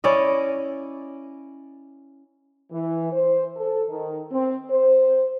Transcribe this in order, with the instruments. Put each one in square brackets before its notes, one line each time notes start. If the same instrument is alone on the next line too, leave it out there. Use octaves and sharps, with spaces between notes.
[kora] C#4 E4 D5 D#5
[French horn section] E3
C5
A4
D#3
C4
C5